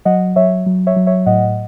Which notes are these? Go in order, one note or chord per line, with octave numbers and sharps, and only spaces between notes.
F#3 D#5 F#5
F#3 C#5 E5
F#3
C#5 E5
F#3
C#5 E5
A2 D#5 F#5